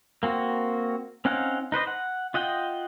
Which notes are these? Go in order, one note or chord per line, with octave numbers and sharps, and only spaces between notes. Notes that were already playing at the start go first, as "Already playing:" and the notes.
A#3 C4 F#4
C4 C#4 D#4 F5 F#5
D#4 B4 C5 D#5
F#5
F4 D#5 F#5 G5